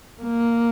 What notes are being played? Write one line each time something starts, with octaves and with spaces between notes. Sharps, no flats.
A#3